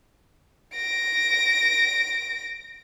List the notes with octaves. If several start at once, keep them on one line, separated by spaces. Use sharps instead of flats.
A#6 D7